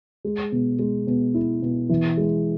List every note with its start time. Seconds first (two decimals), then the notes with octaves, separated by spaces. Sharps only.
0.25 G#3
0.52 B2
0.79 G#3
1.07 B2
1.35 E4
1.62 B2
1.89 E3
2.17 G#3